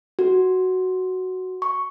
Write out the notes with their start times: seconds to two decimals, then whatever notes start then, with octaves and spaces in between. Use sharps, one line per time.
0.19 F#4
1.62 C#6